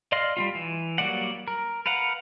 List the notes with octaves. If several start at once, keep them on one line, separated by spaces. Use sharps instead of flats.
D5 D#5 F5 C6 F6
G3 C4 F4
E3
F#3 G3 A#3 D5 F#5
A#4
A#4 B4 F5 F#5